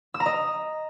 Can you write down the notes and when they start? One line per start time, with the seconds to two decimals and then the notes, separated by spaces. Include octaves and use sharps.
0.14 E6
0.20 A#5
0.26 D#5